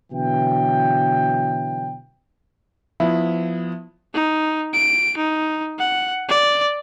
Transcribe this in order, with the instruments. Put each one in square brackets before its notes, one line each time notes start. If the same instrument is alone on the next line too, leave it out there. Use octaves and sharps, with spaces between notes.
[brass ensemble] B2 D3 E3 F#3 G5
[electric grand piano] F3 B3 [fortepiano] E4
[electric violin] D#4
D7
D#4
F#5
D5